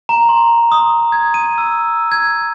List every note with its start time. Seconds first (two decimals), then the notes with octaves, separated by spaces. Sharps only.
0.09 A#5
0.29 C6
0.72 D#6
1.12 G#6
1.34 D#7
1.58 E6
2.12 G#6